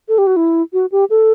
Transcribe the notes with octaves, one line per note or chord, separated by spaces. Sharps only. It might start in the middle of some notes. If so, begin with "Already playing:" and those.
A4
G4
F#4
E4
F#4
G4
A4